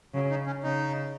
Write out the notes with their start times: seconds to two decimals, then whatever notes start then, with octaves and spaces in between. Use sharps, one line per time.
0.14 C#3 F#3
0.30 D#4
0.47 C#4
0.63 C#3 D#4